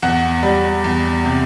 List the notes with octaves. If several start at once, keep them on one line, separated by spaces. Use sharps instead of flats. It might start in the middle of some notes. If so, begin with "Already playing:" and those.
E2 F#5
G3
E2
C3